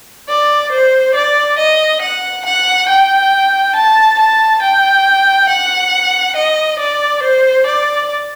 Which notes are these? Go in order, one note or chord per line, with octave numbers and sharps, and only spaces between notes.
D5
C5
D5
D#5
F#5
F#5
G5
A5
A5
G5
F#5
D#5
D5
C5
D5